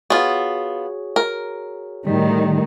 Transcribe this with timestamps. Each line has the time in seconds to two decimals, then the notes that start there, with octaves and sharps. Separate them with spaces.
0.10 B3 F4 F#4 G#4 C#5
1.16 A#4
2.07 A2 D#3 G3